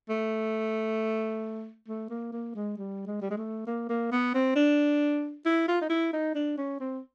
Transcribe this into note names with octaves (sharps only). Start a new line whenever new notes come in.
A3
A3
A#3
A#3
G#3
G3
G#3
G3
G#3
A3
A#3
A#3
B3
C4
D4
E4
F4
D#4
E4
D#4
D4
C#4
C4